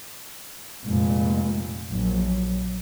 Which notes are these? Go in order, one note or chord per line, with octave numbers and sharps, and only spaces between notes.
F1 A#2 G#3
A#1 F#3